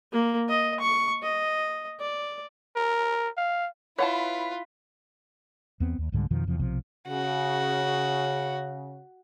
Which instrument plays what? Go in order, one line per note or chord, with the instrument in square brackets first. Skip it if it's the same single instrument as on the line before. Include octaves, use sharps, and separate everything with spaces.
[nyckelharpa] A#3
D#5
C#6
D#5
D5
[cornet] A#4
F5
[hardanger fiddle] E4 [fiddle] F4 [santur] B4 [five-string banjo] C#5 F#5 A5
[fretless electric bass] E2 B3 C4
D#2
C2 G#2 D3 G3
F2 B2 D#3 F3
E2 C3 F3
B1 C3 F3
[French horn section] C#3 [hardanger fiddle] F#4